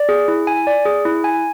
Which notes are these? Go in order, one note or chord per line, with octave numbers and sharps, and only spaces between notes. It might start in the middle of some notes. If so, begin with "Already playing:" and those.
Already playing: D5
G#4
E4
G#5
D5
G#4
E4
G#5